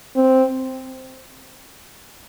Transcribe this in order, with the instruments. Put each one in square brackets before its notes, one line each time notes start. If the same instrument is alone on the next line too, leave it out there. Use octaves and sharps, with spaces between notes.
[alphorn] C4